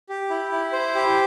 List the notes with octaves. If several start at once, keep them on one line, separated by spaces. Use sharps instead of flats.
G4
E4
E4
C5
G4